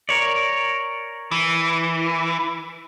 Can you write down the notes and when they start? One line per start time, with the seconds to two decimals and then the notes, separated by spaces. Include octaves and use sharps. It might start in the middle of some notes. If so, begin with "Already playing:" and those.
0.09 A#4 C#5 D5
1.31 E3